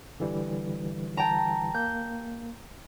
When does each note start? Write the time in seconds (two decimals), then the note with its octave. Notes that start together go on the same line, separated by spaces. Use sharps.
0.20 D3 E3 G3
1.17 G5 A5 A#5
1.74 A#3 G6